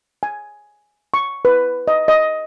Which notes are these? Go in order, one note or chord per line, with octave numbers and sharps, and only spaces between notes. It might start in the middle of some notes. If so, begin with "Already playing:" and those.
G#5
C#6
B4
D#5
D#5